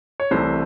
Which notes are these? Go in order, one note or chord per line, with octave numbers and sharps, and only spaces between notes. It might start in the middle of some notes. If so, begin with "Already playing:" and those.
C#5
C2 C3 E3 A3 C5